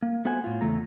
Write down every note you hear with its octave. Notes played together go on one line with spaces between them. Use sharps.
A#3
A3 B3 F#4 C5 F#5 G#5
A2 F4
E2 C#3 A3 A4 A#5